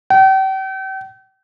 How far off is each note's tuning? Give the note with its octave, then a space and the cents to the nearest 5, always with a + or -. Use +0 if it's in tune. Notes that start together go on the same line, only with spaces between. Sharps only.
G5 -40